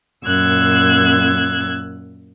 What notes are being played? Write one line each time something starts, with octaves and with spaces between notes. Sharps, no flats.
F#2 A#2 E6 F#6 G#6